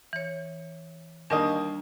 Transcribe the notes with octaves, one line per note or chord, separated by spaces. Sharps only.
E3 C#5
D#2 G3 A#3 D4 D#5 C#6